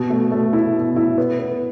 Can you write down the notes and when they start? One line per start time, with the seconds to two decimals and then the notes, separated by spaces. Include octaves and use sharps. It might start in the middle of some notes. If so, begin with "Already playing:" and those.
Already playing: B2
0.10 A3
0.32 A3
0.53 E4
0.75 B2
0.96 E4
1.18 B3
1.39 B3